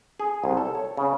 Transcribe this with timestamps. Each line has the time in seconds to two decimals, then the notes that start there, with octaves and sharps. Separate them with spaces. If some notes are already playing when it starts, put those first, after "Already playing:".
0.20 G#4
0.44 C2
0.57 A4
0.75 C#5
0.97 C#3